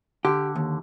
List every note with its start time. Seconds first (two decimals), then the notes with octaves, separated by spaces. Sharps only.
0.25 D3 G4
0.55 D#2